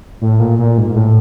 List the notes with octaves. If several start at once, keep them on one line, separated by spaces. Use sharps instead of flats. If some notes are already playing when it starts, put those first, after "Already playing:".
A2
A#2
A#2
G#2
G#2
A2